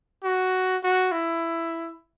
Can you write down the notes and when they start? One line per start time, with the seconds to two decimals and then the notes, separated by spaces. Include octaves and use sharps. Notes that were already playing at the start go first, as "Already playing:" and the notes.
0.24 F#4
0.83 F#4
1.12 E4